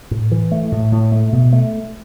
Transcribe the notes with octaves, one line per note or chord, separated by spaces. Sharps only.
A2
E3
A3
A2
A2
A3
B2
A3